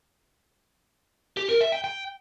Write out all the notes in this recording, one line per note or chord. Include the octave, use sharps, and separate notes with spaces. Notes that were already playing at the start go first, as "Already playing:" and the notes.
G4
A#4
E5
G5
G5